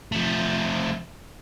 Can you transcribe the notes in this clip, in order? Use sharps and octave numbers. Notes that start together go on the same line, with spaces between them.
F3 A3